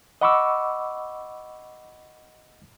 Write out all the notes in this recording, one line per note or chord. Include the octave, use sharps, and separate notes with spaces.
D#5 F#5 B5 C#6 D6 E6